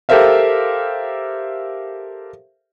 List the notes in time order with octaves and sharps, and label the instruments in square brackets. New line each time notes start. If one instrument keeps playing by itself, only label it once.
[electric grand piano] G4 A4 A#4 C5 E5 F5